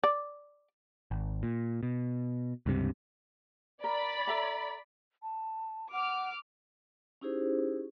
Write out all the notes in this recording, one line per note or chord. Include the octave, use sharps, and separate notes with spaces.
D5
G#1
A#2
B2
C#2 G2 C3
A#4 D5 B5
A4 E5 A#5
A5
F#5 D6 F6
C#4 D#4 E4 G4 G#4 C5